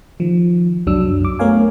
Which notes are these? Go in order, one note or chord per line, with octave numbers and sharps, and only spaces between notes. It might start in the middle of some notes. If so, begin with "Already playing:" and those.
D#3 F3
C2 F#2 F#3 D4 E6
F#2 D6
A3 B3 A#4 C#5 F5 G#5